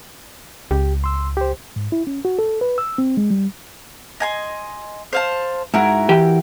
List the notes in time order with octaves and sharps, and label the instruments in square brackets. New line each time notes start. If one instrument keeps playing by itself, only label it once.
[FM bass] C#2 [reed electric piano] G4
[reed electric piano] C6 E6
G4 C5
G#2
E4
C#4
F#4
A4
B4
E6
C4
G#3
G3
[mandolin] D#5 G#5 C6
C5 F5 A5
[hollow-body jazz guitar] G#2 [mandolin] E4 F#4 A#4
[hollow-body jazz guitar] E3 G4 G5